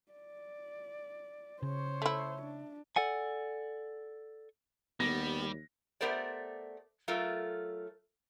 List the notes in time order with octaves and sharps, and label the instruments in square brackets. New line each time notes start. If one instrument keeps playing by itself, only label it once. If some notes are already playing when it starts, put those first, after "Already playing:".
[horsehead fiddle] D5
[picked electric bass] C#3 [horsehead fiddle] C5 C#5
[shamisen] A3 E4
[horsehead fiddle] D4
[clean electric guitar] A4 D5 F#5 G#5
[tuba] D#2 [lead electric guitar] G3 [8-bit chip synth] B3 [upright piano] A#6
[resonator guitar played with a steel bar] A3 B3 G4 A#4 C5 D5
F#3 A3 F4 A4 A#4